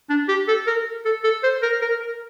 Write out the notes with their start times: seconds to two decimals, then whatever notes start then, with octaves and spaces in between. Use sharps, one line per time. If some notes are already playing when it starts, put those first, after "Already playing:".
0.10 D4
0.28 G4
0.48 A4
0.67 A#4
1.05 A4
1.24 A4
1.43 C5
1.62 A#4
1.81 A#4
2.00 A#4